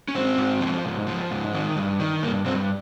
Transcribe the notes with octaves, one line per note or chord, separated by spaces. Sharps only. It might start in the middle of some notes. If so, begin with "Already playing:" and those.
C#4
G#2 C4
G#2
F3
G#2
F3
G#2
D#3
G2
D#3
G2 A#3
G2 C4